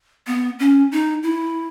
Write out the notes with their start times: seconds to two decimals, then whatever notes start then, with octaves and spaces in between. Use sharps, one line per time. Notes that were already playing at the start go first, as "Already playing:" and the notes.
0.27 B3
0.59 C#4
0.92 D#4
1.23 E4